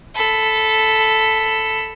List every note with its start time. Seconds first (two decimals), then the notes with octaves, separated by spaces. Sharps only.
0.15 A4 B5